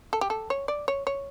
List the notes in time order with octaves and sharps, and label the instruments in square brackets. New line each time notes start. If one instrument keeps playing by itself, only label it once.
[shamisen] A4
G4
A4
C#5
D5
C#5
C#5